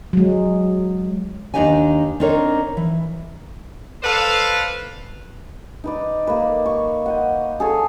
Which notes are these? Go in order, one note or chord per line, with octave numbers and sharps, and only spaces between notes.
F#3 G#3
D#2 D4 D#4 G4 D#5 G#5
C4 D4 D#4 A#4 C#5
E3
A4 B4 C5 D5 F5
D#4 B4 D5
A#3 B4
C#6
C5 D#5 F#5
G#4 A4 C#5